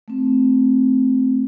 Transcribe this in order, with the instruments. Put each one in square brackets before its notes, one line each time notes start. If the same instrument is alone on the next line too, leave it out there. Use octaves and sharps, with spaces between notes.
[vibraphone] A3 C4